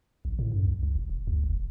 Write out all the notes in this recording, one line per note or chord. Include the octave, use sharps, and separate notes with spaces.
A1
A2
F#2
B1
C2
E1
E1
D2
F#1
D#1